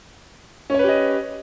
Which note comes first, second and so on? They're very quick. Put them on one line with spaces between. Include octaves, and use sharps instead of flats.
C#4 C#5 B4 G4 D#5